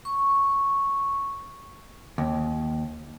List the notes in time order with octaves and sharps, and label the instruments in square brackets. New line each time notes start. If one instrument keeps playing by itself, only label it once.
[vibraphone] C#6
[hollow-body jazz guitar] D#2